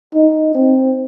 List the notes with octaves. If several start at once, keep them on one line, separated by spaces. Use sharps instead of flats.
D#4
C4